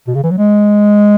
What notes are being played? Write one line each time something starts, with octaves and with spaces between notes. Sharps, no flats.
B2
C#3
E3
F#3
G#3